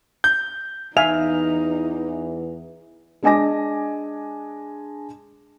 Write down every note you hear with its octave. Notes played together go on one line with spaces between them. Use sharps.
G6
E2 E3 D#4 E5 F5 G#5 F7
G#3 D4 D#5 G#5 D6 A#6